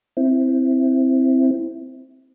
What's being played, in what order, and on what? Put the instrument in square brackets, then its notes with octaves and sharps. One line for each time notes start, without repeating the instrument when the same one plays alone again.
[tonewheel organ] C4 E4